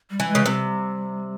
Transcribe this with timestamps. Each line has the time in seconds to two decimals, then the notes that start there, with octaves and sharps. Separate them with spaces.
0.10 G3
0.20 E3
0.28 G#3
0.35 C#3
0.46 C3 G3